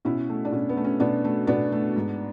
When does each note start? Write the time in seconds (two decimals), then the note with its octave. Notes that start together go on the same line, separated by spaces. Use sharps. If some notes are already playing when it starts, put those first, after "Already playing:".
0.05 B2 C#4 E4
0.29 A3
0.45 D4
0.52 B2 C#4
0.69 B3
0.77 A3
0.84 C#4
1.00 B2 B3 D4
1.24 A3
1.47 B2 B3 D4
1.72 A3
1.96 G#2